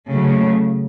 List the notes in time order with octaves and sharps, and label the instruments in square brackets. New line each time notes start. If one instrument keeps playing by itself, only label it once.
[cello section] C#3 F#3 A3